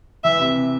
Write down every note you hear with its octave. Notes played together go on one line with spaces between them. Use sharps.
E3 E5
C3